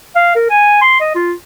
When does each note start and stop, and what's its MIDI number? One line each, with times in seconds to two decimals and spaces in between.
0.16 0.33 77
0.36 0.46 70
0.50 0.80 80
0.81 0.97 84
1.00 1.12 75
1.15 1.33 65